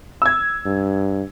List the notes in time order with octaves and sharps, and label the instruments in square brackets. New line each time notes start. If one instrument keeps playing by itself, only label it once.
[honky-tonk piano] E6 G#6
[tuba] G2